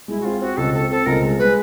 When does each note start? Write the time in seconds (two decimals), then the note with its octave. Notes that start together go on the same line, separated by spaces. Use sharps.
0.08 G#3 E4
0.21 F#4
0.25 C4 F4
0.41 C4 F#4
0.57 C#2 A4
0.74 C4 A4
0.90 C4 A4
1.06 C#2 A#4
1.23 G#3
1.39 G#3 B4